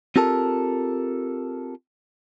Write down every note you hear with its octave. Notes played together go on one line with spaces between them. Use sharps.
C4 F4 G4 A4 A#4 A5